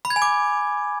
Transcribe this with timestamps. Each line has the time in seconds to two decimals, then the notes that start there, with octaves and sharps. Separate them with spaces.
0.05 B5
0.10 G#6
0.16 G#5
0.22 D6